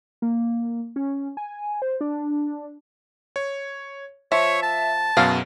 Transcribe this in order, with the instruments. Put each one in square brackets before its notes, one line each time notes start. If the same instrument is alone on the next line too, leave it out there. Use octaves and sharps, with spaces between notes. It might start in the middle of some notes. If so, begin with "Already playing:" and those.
[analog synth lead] A#3
C#4
G#5
C5
D4
[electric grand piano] C#5
[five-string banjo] F3 [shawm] C#5 [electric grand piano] E5
[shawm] A5
[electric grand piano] F#2 B2 [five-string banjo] F#3 G#4 F5